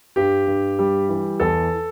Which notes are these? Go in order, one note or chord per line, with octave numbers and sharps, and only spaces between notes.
G2 G4
G2
G3
E3
E2 A4